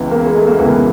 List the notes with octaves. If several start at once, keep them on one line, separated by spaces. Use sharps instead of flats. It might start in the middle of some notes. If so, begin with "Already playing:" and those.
Already playing: C#2 C#3 E3 B3
A#3
G#3
A3
A#3
C#2 C#3 E3 B3